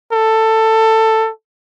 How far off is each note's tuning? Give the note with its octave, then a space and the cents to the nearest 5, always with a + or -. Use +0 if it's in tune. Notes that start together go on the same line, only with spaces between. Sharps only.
A4 +15